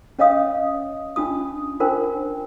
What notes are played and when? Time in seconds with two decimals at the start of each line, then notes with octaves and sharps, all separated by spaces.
0.19 C#4 C#5 D#5 F5 D#6
1.16 C#4 D4 F4 D#6
1.80 D4 F4 A#4 C5 G5